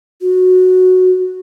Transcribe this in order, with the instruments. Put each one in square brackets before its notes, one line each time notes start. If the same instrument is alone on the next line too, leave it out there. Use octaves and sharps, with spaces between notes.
[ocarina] F#4